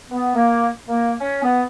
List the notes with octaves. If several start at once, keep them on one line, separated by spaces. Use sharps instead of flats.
B3
A#3
A#3
C#4
B3